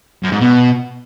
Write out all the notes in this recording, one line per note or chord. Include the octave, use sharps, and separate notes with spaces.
F#2
G#2
B2